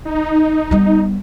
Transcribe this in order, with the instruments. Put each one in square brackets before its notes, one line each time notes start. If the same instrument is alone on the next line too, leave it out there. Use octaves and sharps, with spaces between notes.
[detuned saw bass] D#4
[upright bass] G3 B3